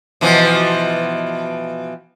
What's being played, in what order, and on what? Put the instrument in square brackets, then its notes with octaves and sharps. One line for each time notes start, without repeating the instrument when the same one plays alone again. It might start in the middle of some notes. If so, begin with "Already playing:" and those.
[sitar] B2 E3 F3